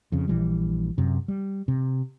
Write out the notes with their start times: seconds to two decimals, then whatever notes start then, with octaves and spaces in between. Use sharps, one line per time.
0.12 F2 C#3
0.28 A#1 E3 G3
0.98 F#2 C3
1.28 G3
1.68 C3